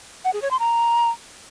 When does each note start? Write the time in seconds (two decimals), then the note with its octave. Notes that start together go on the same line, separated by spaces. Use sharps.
0.25 F#5
0.33 G#4
0.42 C#5
0.51 C6
0.60 A#5